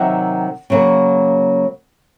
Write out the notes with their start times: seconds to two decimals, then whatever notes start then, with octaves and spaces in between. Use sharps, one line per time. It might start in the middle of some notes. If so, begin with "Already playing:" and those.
Already playing: C3 D#3 F#3 E5 F#5
0.70 C#3 F#3 A#3